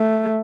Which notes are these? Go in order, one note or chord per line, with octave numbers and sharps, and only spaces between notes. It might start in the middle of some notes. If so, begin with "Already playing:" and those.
Already playing: A3